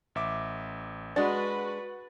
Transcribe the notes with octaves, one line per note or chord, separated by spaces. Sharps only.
A1 E5 D6
G#3 D4 F#4 B4 F#5 A6